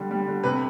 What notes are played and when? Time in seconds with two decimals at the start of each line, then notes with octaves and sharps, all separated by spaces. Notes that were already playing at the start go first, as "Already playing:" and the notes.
Already playing: D3 G3
0.11 G3
0.28 D3
0.43 C3 B4